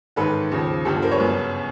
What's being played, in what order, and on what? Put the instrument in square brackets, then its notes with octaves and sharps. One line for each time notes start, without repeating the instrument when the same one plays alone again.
[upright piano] A1 G#2 D#3 A4 B4
D#2 C#3 F3
G1 G2 D3 F3 G4 A4
A#4 C5
B4 C#5
G1 F#2 C#3